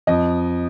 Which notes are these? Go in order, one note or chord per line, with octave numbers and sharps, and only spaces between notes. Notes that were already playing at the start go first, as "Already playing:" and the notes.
F2 D#5